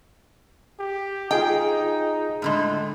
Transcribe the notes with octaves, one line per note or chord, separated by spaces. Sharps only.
G4
D#4 F4 G#4 D#5 G5
A2 D3 G#3